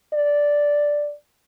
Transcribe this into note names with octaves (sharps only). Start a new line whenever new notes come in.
D5